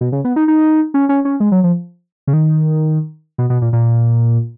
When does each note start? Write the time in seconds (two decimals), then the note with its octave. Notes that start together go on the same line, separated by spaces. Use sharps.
0.01 B2
0.12 C#3
0.25 B3
0.36 D#4
0.48 D#4
0.94 C#4
1.09 C#4
1.25 C#4
1.40 G#3
1.52 F#3
1.64 F3
2.27 C#3
2.33 D#3
3.38 B2
3.50 B2
3.62 A#2
3.73 A#2